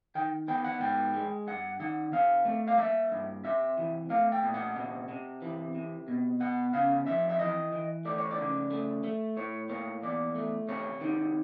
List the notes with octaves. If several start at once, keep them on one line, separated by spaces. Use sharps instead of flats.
D#3 G5
B3 G5
F#5
G#2 G5
G#3
G2 F#5
D#3 F#5
C3 F5
A3
F5
A#3 E5
G2
C3 E5
E3
A3 F5
G5
A#2
F#5
C3
C3
E3
C3
B2
B3 F#5
C#3 F5
F2 E5
E5
E3 D#5
E3
A3 D5
C#5
D5
C#3
A3
A3
A2 C#5
A#3 C#5
E2 D5
A3
C3 C#5
D#3